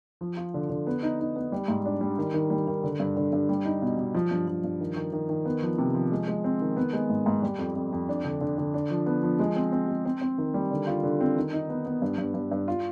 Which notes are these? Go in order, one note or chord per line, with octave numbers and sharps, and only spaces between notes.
F3
F4
D3
D3
B3
D#4
D#4
B3
G3
G#2
D4
G3
D#3
D#3
G3
D#3
D3
G2
D3
G2
G3
D#4
B2
B2
F3
G2
F3
G2
D#3
D#3
D#3
D#3
B3
F3
C3
F3
G#3
G#3
C4
D#3
B3
G#3
G#2
G#2
G3
F2
F2
F2
D4
D3
D3
D3
D4
F3
B3
F3
G#3
C4
C4
G#3
C4
C4
D#3
G3
D3
F4
D3
C4
D#3
D#4
B3
B3
G2
G2
G2
G2
F4